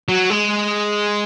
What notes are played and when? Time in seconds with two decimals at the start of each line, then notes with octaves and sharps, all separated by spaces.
0.09 F#3
0.30 G#3